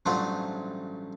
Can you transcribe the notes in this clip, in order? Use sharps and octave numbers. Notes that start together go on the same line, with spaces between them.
A1 G2 F#3 A3 F4 C5